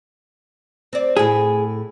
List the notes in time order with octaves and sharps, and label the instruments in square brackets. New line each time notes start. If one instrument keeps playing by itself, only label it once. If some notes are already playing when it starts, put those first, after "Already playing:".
[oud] C4 D5
[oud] A2 E4 [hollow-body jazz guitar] G#4